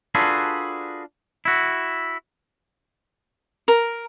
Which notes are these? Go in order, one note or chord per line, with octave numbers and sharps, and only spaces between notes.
D4 F4 F#4 G#4 A4 B4
E4 F#4
A#4